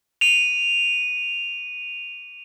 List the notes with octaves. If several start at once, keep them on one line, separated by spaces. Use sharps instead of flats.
D#7 F7